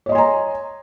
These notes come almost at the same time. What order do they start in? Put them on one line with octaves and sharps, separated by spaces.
C#5 D#5 C6 G#5 A#5